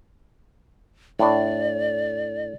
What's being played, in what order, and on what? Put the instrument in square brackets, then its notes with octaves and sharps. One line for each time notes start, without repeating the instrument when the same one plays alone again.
[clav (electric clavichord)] A2 D4 [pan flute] D5